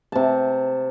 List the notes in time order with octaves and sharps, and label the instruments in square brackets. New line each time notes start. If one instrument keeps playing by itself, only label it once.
[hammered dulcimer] C3 A5